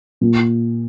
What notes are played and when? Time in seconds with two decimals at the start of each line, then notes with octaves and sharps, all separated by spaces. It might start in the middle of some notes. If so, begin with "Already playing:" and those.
0.21 A#2